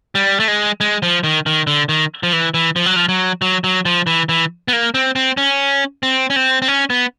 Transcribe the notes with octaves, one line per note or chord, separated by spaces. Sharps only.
G3
A3
G#3
G#3
F3
D#3
D#3
D3
D#3
F3
E3
E3
F3
F#3
F3
F#3
F#3
F#3
F3
E3
E3
B3
A#3
C4
C4
C#4
C4
C#4
C4
C4
C#4
B3